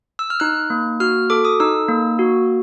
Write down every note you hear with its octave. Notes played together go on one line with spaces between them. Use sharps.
E6
F6
D#4 F#6
A#3
F#4 F6
A4 D6
D#6
D#4 E6
A#3
F#4